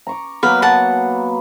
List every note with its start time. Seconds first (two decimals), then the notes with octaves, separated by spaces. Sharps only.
0.07 A#5 C#6 D6
0.43 F#3 A#3 B3 A#4 B4
0.62 F#5 A5